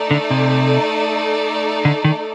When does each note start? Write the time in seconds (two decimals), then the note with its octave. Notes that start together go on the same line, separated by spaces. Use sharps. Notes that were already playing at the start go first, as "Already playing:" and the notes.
Already playing: A3 D#4 A4 D5
0.11 D3
0.30 C3
1.85 D3
2.05 D#3